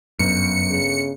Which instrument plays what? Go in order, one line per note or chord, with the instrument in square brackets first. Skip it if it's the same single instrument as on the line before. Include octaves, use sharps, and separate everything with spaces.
[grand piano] G1 [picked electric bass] F#2 [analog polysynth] C#7
[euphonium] C#3